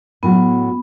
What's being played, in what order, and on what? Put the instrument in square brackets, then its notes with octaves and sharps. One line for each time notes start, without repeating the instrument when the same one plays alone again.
[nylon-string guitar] A2 F#3 C#4 F#4 [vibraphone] B3